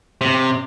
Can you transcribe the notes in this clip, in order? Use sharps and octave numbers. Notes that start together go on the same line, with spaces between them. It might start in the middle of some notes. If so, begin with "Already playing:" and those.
C3